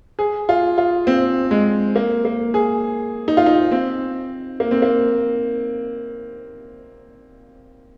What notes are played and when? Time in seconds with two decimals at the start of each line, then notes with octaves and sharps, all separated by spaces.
0.19 G#4
0.49 F4
0.78 F4
1.07 C4
1.51 G#3
1.96 A#3
2.25 A#3
2.54 G#4
3.28 D#4
3.37 F4
3.46 D#4
3.72 C4
4.60 A#3
4.71 C4
4.82 A#3